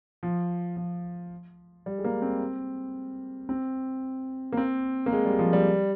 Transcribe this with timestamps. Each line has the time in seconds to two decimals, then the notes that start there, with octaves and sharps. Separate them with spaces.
0.23 F3
0.77 F3
1.86 G3
1.98 G#3
2.04 A#3
2.22 C4
3.49 C4
4.52 A#3
4.57 C4
5.06 A#3
5.12 G#3
5.25 G3
5.39 F3
5.53 G3